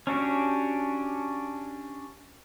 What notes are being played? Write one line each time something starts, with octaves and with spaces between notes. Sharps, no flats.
C#4 D4 F#4 G4